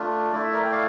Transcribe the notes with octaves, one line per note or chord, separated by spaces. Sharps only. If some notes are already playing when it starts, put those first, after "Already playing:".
Already playing: A3 D4 F4
A3 E4 D5
E5
A#4 D5
G5
D5 F5